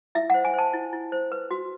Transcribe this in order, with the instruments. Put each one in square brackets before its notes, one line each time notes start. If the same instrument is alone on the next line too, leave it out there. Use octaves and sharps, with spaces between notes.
[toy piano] E4 E5
C5 F#5
G#5
C5 A5
E4
E4
C5
B4
F#4